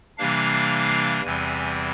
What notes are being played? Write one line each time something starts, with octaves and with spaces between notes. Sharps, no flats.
C3 E3 G3 A#3 D4 F5
E2 C3 E3 G3 C4 G#5